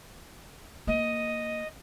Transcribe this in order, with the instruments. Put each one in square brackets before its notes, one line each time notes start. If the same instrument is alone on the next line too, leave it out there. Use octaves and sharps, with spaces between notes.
[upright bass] A#3 [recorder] D#5